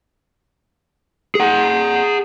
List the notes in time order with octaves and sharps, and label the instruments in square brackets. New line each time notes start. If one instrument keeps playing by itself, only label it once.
[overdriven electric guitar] G#4 F#5